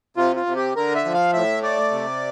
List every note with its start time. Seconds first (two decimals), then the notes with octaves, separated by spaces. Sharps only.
0.17 C3 F4
0.36 F4
0.46 C3
0.56 G4
0.76 D3 A#4
0.95 E5
1.05 F3
1.14 F5
1.33 A2 E5
1.62 A3 D5
1.91 C3